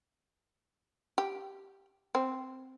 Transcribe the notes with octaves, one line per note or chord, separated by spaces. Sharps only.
G4
C4